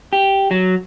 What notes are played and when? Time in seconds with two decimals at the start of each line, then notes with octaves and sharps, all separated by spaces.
0.13 G4
0.51 F#3